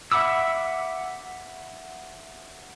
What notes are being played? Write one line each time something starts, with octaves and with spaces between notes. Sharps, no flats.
E5 F#5 B5 D6 E6